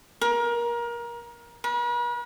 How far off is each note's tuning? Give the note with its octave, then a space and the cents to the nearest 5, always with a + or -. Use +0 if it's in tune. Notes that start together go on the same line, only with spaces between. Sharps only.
A#4 +25
B4 -45